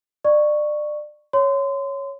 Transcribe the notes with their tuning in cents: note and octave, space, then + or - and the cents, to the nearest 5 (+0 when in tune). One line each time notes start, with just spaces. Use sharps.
D5 +25 C#6 +0
C#5 +0 C6 -25